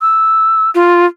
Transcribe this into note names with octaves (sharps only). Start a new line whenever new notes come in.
E6
F4